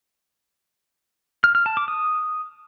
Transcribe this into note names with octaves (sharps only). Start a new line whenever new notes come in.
F6
F6
A5
D6
D#6